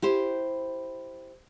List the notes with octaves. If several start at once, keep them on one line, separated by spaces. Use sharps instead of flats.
E4 G4 C5